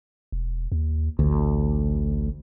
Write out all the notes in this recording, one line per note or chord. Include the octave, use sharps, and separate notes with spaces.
E1
D#2
A1 D2